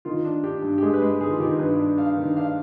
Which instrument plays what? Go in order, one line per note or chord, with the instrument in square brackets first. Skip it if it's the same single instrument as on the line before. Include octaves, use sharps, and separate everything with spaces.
[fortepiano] D#3 F4
D4
D4 G4
G2
G4
G#3 G#4
B4
G#3 G#4
D#3 G#4
F4
D#3 G4
G2 B4
D4
D4 F5
D#3
D4 F5